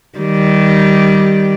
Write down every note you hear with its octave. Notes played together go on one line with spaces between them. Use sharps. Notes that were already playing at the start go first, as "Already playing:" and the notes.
D#3 G3